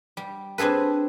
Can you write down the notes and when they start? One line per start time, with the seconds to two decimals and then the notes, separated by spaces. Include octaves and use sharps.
0.17 G3
0.58 C4 D4 G#4 A4 B4